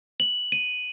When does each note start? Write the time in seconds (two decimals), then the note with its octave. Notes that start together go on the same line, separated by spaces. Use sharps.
0.20 F#7
0.52 D#7